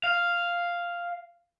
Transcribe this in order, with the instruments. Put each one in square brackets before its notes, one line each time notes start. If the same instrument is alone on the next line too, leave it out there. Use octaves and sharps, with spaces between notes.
[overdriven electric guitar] F5